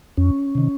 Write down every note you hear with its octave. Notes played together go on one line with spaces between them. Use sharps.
F2 C#4
C3 D#3